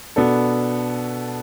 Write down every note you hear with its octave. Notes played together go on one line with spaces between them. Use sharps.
B2 B3 D4 A4